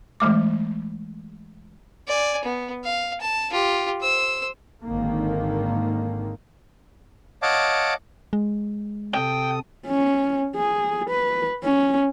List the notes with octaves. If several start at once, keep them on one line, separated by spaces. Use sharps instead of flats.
E3 G#3 A3 D6
D5 G#5
B3
F5
A5
F4 G4
C5 E6
G#1 D3 D#3 A#3
C#5 D#5 F5 F#5 A5 D6
G#3
C3 A4 G5 D#6
C#4
G#4
B4
C#4